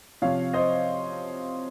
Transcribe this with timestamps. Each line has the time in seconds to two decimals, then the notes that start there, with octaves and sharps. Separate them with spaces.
0.22 C3 F3 C#5 F5
0.53 C5 D#5